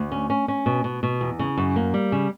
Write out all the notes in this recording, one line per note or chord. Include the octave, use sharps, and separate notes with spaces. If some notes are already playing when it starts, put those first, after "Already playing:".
Already playing: D2
C#4
C#4
C#4
B2
B2
B2
E2
C#3
F#2
A#3
G3
C#3